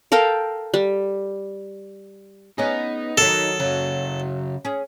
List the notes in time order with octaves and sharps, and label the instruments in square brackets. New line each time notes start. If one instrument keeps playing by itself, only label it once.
[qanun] A4 A#4 F5 G5
G3
[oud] B3 C#4 G#4 [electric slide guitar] D#4
[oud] D#3 F#3 [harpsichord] A4
[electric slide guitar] C#3 F#4 [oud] F#3
[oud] C#4 G#4